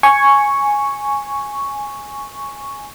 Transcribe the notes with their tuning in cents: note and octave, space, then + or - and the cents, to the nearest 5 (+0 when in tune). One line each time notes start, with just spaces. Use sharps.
G#5 +0 C#6 +0